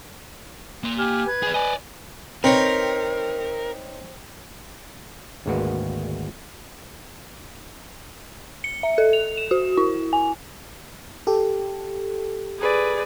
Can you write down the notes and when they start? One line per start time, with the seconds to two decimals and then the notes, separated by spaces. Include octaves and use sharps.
0.83 A#3 C6
0.98 G4 G#5 F6
1.27 B4 G#6
1.43 G#4 D5
1.54 D5 D#5 G#5
2.44 C4 D#4 A#4 B4 C#5
5.46 G#1 D2 G#3 A#3 F#4 B4
8.64 C#7
8.83 E5
8.98 A4
9.13 F7
9.37 E7
9.51 F#4
9.77 E4
10.13 G#5
11.27 G4 A4
12.59 G#4 B4 D5